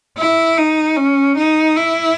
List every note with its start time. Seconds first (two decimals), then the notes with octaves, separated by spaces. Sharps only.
0.18 E4
0.57 D#4
0.97 C#4
1.37 D#4
1.77 E4